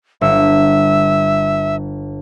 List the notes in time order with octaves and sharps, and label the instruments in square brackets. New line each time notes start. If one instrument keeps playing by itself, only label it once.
[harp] G1 [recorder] E5